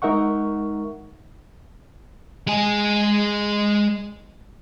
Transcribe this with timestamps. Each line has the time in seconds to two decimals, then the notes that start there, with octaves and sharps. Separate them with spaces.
0.02 G#3 D#4 A#4 E5 F#5 C#6
2.47 G#3 G#4